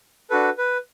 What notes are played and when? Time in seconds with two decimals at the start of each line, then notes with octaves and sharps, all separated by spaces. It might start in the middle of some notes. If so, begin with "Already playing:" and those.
0.30 D4 F#4 A4 B4
0.58 B4